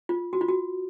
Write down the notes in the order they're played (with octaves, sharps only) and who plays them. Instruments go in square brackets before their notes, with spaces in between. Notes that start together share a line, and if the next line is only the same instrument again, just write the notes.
[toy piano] F4
F#4
F4
F#4